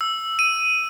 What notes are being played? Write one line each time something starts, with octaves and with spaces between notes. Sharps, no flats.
E6
D#7